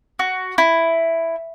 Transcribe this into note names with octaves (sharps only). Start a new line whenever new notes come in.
F#4
E4